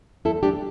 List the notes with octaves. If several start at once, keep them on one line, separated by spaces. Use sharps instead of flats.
E2 E4 A4
D4 G4